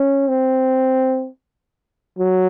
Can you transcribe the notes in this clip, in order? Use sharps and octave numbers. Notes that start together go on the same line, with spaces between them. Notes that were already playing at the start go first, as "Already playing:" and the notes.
Already playing: C#4
C4
F#3